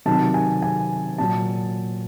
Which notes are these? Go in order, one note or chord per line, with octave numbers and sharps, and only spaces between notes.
C3 D#3 F#3 A5
G#5
G#5
A#2 F#3 A5